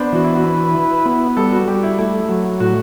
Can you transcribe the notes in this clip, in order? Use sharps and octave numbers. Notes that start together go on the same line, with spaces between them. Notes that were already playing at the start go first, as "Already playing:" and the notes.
Already playing: B3 D4 C5
E3 F#4
E4
F#4
B4
E4
B3
G3 A4
F#4
G3 G4
E4
A3 E4
F#3
A2 F#4